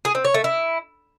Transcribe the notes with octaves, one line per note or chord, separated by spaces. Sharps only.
G#4
C4
C#5
A3
E4